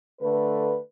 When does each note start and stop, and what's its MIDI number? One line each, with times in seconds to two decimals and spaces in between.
0.21 0.77 50
0.21 0.77 57
0.21 0.77 71